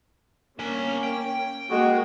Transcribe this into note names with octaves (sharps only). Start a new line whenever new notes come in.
A#3 C#4 D4 G#5
G5
G#3 A#3 F#4